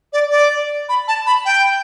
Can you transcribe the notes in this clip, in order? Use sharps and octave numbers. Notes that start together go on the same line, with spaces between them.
D5
D5
B5
A5
B5
G5